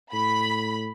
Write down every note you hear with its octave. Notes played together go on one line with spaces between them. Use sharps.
A2 B5